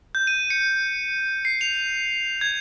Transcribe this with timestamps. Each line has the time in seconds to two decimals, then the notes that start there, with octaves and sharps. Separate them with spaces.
0.15 G6
0.27 D#7
0.50 C#7
1.45 C7
1.61 F7
2.41 G#6